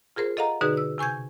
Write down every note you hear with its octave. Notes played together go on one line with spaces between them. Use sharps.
F4 G#4 A#4 C5
A4 D#5 F5 F#5 A#5
B2 D3 D#4 F#4 G#4 B4
E6
C3 G#5 C#6 G6 G#6